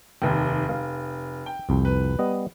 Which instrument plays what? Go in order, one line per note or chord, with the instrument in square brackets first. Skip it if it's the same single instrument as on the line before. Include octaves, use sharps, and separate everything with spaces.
[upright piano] F1 D#2 [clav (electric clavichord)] G5
[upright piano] F1 [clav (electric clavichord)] F5
[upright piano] G5
[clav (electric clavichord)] C2 F2
[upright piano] B4
[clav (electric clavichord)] G3 B3 D#5